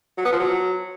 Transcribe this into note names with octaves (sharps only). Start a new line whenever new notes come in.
F#3
B3
F3
F#3